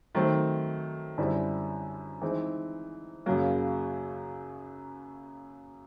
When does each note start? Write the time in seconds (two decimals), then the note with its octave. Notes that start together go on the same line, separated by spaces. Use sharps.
0.15 D#3 F#3 A3 C4
1.18 F#2 D3 G3 C4 E4
2.22 E3 G#3 C4 D#4
3.26 F#2 C#3 F#3 A#3